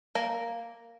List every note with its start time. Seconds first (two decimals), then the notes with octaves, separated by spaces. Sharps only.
0.15 A#3 A#4